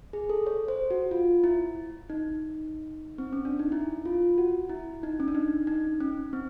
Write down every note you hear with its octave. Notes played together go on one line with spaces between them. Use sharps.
G#4
A4
C#5
C5
F#4
F4
E4
D#4
C4
C#4
D4
D#4
E4
F4
F#4
E4
D#4
C#4
D4
D#4
D#4
C#4
C4